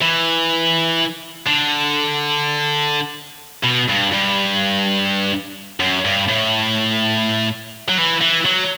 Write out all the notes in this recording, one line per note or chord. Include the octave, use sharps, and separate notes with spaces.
E3
D3
B2
G2
G2
F#2
G2
A2
F#3
E3
E3
F#3